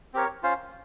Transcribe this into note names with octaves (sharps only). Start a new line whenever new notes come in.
C4 G4 A#4 C#5
C#4 F4 C5 F5